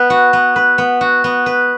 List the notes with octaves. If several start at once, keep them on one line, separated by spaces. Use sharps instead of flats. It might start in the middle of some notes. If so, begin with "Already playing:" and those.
Already playing: B3 B4
F#4
B3
B4
B3
F#4
B3
B4